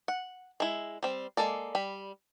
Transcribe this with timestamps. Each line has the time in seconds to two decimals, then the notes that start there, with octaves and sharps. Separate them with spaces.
0.08 F#5
0.60 G#3 E4
1.03 G3 C4
1.37 G#3 A#3 A4 D5
1.75 G3 B5